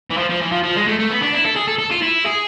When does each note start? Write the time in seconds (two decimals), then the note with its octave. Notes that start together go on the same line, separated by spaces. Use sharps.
0.11 E3
0.17 F3
0.30 F3
0.41 E3
0.52 F3
0.63 F3
0.76 G#3
0.87 A3
0.99 A3
1.10 B3
1.22 D4
1.34 E4
1.45 A4
1.56 G#4
1.68 A4
1.79 A4
1.91 F4
2.02 E4
2.25 G#4